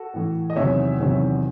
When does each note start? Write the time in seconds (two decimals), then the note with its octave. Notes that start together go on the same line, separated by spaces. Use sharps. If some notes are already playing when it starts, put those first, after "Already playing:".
Already playing: F#4 A4
0.14 A2 E3
0.50 D#5
0.56 E2 C3 D#3 F#3 C#5 E5
0.99 E2 C3 D#3 F#3